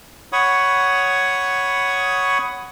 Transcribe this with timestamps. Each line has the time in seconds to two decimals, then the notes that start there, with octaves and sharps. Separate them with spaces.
0.33 C#5 F#5 B5 C#6 D#6